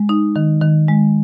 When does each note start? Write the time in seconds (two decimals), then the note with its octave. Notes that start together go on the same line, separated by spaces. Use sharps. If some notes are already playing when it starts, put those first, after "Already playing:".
Already playing: G#3
0.09 D#4
0.36 D#3
0.62 D#3
0.88 G#3